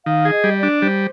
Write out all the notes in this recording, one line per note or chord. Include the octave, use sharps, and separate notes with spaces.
D#3 F5
G#4
D#5
G3
D5
D4
G3 C5